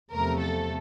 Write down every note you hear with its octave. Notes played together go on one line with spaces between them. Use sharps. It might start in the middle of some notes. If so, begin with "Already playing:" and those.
E2 C3 F3 A3 A#4
A4